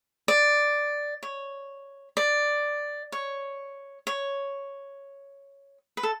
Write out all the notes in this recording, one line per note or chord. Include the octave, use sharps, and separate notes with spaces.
D5
C#5
D5
C#5
C#5
B4
A4